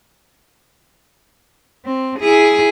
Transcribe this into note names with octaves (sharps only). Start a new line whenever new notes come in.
C4
E4 G#4